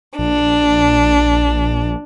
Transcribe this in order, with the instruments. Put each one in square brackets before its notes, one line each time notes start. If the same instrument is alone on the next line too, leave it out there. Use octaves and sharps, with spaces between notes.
[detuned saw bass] A#1 [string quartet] D4